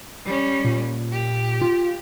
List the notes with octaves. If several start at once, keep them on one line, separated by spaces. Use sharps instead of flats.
G3 C#4
A#2
G4
F4